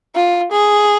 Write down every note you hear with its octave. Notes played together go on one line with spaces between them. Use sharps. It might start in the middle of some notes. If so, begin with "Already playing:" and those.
F4
G#4